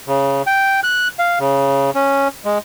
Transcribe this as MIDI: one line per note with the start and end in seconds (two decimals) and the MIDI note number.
0.07 0.42 49
0.47 0.80 79
0.84 1.08 90
1.19 1.39 77
1.39 1.91 49
1.95 2.28 61
2.45 2.58 56